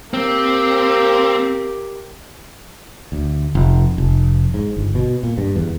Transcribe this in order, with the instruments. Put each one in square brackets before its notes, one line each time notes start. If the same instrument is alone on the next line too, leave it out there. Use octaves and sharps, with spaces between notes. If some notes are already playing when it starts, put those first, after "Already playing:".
[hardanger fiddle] A#3 G4 [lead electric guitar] C4
[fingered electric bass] D2
F1
F1
G#2
G1
B2
A#2
G2
E2